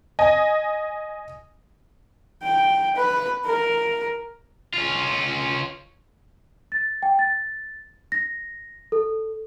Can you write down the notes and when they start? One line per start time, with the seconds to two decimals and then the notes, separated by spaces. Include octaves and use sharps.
0.19 D#5 G#5
2.42 G5
2.96 B4
3.46 A#4
4.74 C#4 F4
6.72 A6
7.03 G5
7.19 A6
8.12 A#6
8.92 A4